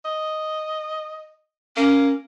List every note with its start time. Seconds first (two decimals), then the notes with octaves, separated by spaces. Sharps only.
0.05 D#5
1.77 A#3 C#4